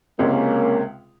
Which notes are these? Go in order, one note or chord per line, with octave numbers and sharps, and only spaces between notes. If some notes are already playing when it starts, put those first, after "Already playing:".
C#2 C3 G#3 A#3 C#4 A#4